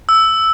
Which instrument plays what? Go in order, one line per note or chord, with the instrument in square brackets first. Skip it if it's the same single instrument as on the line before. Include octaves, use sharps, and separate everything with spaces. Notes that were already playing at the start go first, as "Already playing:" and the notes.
[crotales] E6